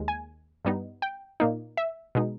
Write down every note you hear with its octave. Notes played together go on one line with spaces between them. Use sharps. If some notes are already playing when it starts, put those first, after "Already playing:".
Already playing: D#2 D#3 G#3
G#5
G2 G3 B3 D#4
G5
A#2 A#3 D#4
E5
B2 G#3 D#4